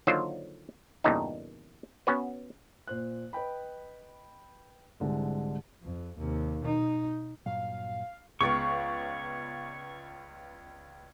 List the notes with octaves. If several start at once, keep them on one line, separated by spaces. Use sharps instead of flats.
D3 D#3 F#3 A#3 F4 C5
E2 G2 A#2 C#3 D#4
B3 C#4 F#4 B4
A#2 C5 F#6
B4 D#5 G5 B5
C2 G#2 D3 G#3
F2
D#2 C3
B2 D#4
G2 A#2 F#3 F5
C#2 B3 C#5 D5 F5 C#6